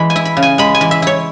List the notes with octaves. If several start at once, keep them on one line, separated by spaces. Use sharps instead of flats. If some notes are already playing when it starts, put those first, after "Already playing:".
Already playing: E3 G#3 B5
G#5
E4
B5
C#3
G#5
G#3 B5
G#5
E3
E5
E4 C#5